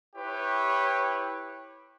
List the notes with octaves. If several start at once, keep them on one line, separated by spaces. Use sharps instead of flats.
E4 G4 B4 C#5